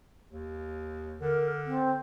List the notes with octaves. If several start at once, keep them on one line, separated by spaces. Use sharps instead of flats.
D#2
D3 A#4
C4